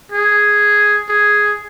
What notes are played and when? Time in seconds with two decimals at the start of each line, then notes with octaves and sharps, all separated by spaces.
0.12 G#4
1.09 G#4